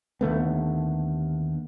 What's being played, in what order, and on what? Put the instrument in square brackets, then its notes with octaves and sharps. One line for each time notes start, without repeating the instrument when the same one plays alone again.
[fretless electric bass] D#2 D3 A3 B3